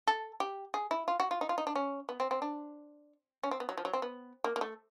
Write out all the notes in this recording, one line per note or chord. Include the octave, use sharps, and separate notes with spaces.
A4
G4
G#4
E4
F4
F#4
F4
D#4
F4
D#4
D4
C#4
B3
C4
C4
D4
C#4
C4
B3
F#3
F3
F#3
C4
B3
A#3
A#3
A3